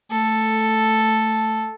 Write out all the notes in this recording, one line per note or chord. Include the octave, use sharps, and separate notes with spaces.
A3 A4